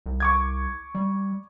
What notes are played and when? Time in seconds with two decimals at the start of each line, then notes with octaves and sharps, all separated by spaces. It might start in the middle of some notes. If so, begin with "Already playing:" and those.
0.06 C2
0.20 C#6 D6 G#6
0.95 G3